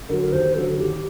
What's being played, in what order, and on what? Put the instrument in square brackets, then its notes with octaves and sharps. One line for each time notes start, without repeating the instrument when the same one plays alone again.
[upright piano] D3 F#3 [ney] A#4
[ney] A#4
[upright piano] D#2 [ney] C5
[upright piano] D3 F#3 [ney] A4
[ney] A4
[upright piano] D#2 [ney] G4